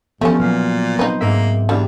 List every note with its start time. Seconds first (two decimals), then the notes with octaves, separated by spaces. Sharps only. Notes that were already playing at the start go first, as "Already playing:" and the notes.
0.21 G2 F3 A3 B3 C#4
0.40 A#2 F#3 F6 C7
0.99 C4 D#4 B4 C5
1.21 G#2 A#3 E5
1.69 E2 E3 G3 D4 G4